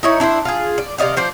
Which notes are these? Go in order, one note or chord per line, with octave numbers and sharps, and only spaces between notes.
D#4 E4 C#5
D4 E4 B4 C5
F4 G#4
D5
C3 D5 D#5 F5
F3 C5 D5